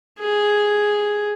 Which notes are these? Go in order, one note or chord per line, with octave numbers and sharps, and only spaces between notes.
G#4